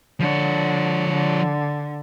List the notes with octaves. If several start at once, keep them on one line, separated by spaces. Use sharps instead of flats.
D3 F3 C#5
D3